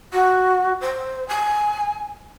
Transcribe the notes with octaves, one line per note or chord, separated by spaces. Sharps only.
F#4
C5
G#5